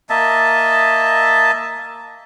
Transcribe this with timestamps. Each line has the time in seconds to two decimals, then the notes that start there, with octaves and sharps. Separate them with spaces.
0.10 A#3 D#5 E5 A5